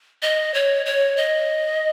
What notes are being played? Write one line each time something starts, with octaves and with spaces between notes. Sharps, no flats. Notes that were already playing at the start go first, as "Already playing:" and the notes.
D#5
C#5
C#5
D#5